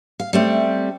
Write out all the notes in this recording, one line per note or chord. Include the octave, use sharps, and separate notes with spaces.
F5
G3 A3 C4